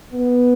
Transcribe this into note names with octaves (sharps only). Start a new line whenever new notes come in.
B3